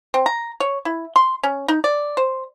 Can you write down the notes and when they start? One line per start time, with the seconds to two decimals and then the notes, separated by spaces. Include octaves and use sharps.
0.14 C4
0.26 A#5
0.60 C#5
0.85 E4
1.16 C6
1.43 C#4
1.68 D#4
1.84 D5
2.17 C5